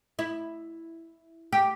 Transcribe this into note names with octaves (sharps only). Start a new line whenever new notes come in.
E4
G4